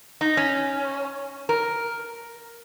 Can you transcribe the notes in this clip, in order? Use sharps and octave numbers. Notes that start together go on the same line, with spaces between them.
D#4
C#4
A#4